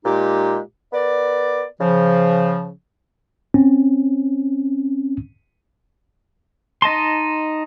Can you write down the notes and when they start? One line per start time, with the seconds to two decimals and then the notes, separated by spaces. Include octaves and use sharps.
0.05 A#2 G#3 D#4 G4
0.93 B3 A#4 D5
1.80 C#3 F3
3.54 C4 C#4
6.82 D#4 D#5 A5 C6